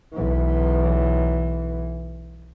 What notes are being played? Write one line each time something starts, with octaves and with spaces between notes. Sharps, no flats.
B1 E3